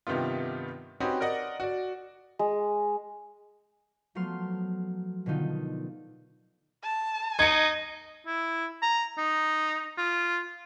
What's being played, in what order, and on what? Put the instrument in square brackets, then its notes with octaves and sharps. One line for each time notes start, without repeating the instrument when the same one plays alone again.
[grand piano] G2 C3 D#3 B3 F4
C4 C#4 D#4 F#4 G4 B4
A#4 D5 D#5 F#5
F#4 D5
[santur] G#3
[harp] F3 F#3 A3 B3 C6 F6
B2 D3 D#3 D#4 F4
[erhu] A5
[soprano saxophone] D#4 [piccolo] D#5 [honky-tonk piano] G#6 C#7
[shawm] E4
A#5
D#4
F4